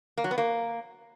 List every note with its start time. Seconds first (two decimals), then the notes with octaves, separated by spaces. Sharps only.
0.18 A#3
0.24 F#3
0.31 B3
0.38 A#3